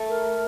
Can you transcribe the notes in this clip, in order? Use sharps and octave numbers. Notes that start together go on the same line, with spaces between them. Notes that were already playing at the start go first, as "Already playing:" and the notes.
Already playing: A3
A#4